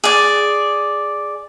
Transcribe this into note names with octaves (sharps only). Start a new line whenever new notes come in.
G#4 D5